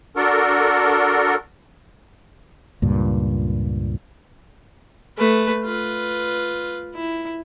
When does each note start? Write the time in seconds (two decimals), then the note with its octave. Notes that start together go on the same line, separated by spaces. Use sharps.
0.16 D4 F#4 A4 A#4
2.82 C#2 G2 A#2
5.17 A3 B4
5.64 F4 B4
6.95 E4